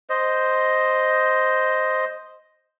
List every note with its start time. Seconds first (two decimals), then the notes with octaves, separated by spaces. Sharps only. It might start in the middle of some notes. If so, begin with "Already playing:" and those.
0.10 C5 D#5